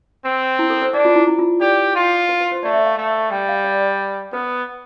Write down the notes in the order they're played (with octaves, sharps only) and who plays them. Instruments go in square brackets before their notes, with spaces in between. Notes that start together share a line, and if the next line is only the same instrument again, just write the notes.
[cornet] C4
[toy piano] E4
A4
C5
[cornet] D4 [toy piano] D5
[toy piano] F4
E4
E4
F4
[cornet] G4 [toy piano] D5
[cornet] F4
[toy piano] B4
B4
C5
[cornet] A3 [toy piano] D5
[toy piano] E5
F5
[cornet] A3
[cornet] G3 [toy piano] G5
[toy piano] F5
D5
[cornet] B3 [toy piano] B4